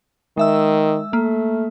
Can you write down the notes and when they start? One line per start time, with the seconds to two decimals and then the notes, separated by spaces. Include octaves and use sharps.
0.37 D#3 G#3 E5 E6
1.13 A3 A#3